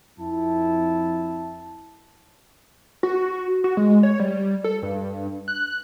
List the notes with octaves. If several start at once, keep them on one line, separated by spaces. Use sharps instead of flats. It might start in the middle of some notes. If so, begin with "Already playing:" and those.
F2 E4 A5
F#4
F#4
G#3
C#5
G3
A4
G2
F#6